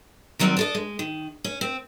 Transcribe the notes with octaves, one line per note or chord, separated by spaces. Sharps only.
D#3 F#3 G3 A#3 C4
D4 A4 D#5
G#3
D#3
C#4
C4